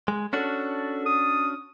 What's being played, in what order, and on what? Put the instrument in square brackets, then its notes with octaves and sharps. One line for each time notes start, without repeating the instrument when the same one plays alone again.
[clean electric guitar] G#3
[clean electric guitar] C#4 D4 F#4 [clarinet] A4
[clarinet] D#6